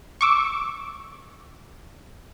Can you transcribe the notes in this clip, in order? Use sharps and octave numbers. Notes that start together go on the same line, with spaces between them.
C#6 D6 E6